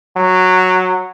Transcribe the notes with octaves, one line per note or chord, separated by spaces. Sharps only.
F#3